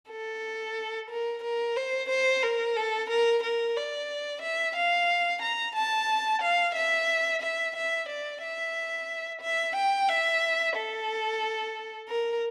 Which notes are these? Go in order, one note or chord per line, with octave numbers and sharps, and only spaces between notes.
A4
A#4
A#4
C5
C5
A#4
A4
A#4
A#4
D5
E5
F5
A#5
A5
F5
E5
E5
E5
D5
E5
E5
G5
E5
A4
A#4